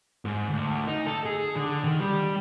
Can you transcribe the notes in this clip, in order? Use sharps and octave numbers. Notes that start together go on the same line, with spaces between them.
G#2
D2
D#4
A4
G#4
D3
D#3
G3